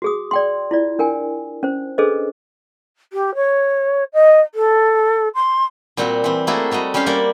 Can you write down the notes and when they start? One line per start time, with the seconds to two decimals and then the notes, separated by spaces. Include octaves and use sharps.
0.02 F#4 G#4 D#6
0.31 D5 G5 C6
0.71 E4 F4 D5
0.99 D4 A#4 G5 G#5
1.63 C#4 C5
1.98 D4 G#4 A4 B4 C5 D#5
3.12 G4
3.35 C#5
4.13 D#5
4.54 A4
5.35 C6
5.97 A#2 G3 C4 F#4 F#5
6.24 E3 C4
6.47 A3 A#3 E4 F#4 G#4 A4
6.71 G3 A3 F#4 D#5
6.94 G3 C#4 G4 F5 C6
7.06 G3 A#3 A#4 D5 F#5